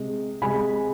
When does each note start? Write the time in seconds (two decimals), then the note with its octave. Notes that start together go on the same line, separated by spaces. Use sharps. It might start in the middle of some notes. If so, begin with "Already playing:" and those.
Already playing: C3 G#3
0.42 C3 G#3 G#5 B5